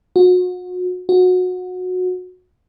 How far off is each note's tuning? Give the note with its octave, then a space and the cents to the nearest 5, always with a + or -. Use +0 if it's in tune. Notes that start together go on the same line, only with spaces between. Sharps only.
F#4 -35
F#4 -20